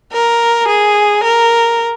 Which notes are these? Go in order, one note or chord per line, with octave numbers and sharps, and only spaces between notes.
A#4
G#4
A#4